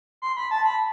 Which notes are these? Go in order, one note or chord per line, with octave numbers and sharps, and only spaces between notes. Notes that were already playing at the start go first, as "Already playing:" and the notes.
C6
B5
A5
B5